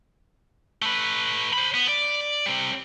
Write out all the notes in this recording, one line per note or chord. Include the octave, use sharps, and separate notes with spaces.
A3 B4
C5 B5
B3
D5
G3 C4